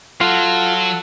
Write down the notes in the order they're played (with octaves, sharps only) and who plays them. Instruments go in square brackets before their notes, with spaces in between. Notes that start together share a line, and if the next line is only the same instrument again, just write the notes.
[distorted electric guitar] F#3 [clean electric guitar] F4 [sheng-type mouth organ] A4 F#5